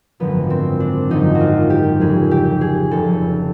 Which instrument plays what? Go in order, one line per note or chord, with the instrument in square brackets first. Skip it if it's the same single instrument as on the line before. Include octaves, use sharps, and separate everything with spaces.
[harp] G#1 F#2 D3 F3 B3
C4
D4
G#1 F#2 D3 F3 D#4
F#4
F4
G4
F1 F2 C#3 G#4
G4
G#4
F1 F2 C#3 A4